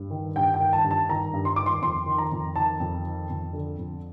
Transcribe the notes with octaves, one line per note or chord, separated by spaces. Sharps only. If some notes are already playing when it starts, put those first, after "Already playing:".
Already playing: G2
D#3
G2 G5
G5
D#3
A5
G2
A5
D#3 A#5
G2
C6
D#3 D6
C6
F2 C6
D#3
A#5
F2
D#3 A5
F2
D#3
F2
D3
F2